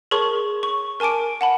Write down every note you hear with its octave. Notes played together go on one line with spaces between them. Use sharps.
G#4 A#4 C#5 A5 C6 C#6
C#6
A#4 G#5 A5 D6 D7
F#5 A5 B5